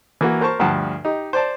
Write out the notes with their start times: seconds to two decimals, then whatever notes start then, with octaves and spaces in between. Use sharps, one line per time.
0.21 E3 A#3 F#4
0.41 A#4 C5 A5 C#6
0.59 D2 G2 F3 F#5 A5
1.05 D#4 G4
1.33 C5 D5 A5